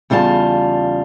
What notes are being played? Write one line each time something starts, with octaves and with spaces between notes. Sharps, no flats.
E2 C#3 G3 F4 A5